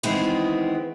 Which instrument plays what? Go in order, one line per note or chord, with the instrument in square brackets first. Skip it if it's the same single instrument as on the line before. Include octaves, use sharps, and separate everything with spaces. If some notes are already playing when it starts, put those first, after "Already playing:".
[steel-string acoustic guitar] D#3 E3 G#3 B3 C4